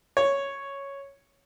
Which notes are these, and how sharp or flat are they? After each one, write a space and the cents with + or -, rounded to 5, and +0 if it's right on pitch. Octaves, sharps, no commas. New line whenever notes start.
C#5 +0